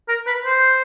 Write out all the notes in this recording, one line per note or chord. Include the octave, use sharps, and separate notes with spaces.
A#4
B4
C5